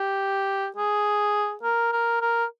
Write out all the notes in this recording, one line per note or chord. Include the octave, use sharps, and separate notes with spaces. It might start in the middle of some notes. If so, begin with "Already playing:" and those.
Already playing: G4
G#4
A#4
A#4
A#4